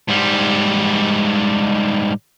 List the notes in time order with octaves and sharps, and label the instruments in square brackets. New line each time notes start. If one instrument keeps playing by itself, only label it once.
[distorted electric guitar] G#2 G3